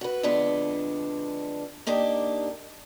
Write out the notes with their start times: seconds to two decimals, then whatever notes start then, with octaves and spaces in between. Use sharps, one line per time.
0.01 F#4 B4
0.23 F2 D3 G#3 B3 D4
1.87 A#3 D4 D#4 G4